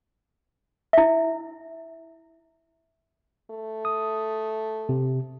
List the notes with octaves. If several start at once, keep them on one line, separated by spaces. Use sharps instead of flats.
E4 E5
A3
D#6
C3